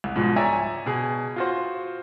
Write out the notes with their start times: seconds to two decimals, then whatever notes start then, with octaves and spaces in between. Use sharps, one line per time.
0.04 C2
0.16 G#2 B2 F3
0.36 C#5 D5 E5 G#5 A#5
0.86 B2 G#4
1.36 F4 F#4 C5